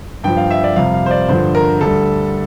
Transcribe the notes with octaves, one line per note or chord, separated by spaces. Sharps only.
G2 F3 G5
F5
E5
D5
F2 C3 G3 F5
F5
C5
D5
G2 D3 F3 C5
A#4
D2 D3 G3 A4